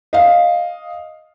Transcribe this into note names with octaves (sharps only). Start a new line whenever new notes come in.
D#5 F5